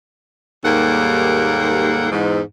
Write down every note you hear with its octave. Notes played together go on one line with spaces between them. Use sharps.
D#2 G#2 G3 A#3 A4 F#5
E2 G#2